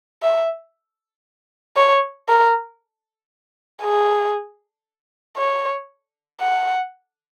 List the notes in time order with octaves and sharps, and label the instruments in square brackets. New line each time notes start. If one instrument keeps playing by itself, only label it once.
[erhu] E5
C#5
A#4
G#4
C#5
F#5